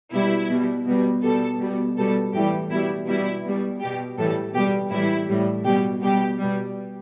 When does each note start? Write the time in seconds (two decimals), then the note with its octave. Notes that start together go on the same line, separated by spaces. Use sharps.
0.13 B2 G3 E4
0.50 B2 G3
0.87 B2 G3
1.23 B2 G3 A4
1.60 B2 G3
1.97 B2 G3 A4
2.34 A2 E3 G3 G4
2.70 B2 G3 E4
3.07 B2 G3 E4
3.44 B2 G3
3.81 B2 G3 G4
4.18 A2 E3 G3 A4
4.54 B2 G3 G4
4.91 A2 E3 G3 E4
5.28 A2 G3
5.64 B2 G3 G4
6.01 B2 G3 G4
6.38 B2 G3